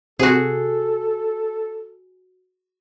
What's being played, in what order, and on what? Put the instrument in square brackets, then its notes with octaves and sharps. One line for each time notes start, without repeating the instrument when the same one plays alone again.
[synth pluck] C3 [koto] F#4 G#4 [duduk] A4